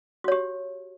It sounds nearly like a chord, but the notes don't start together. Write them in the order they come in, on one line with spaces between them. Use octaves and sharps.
F#4 C#5 G4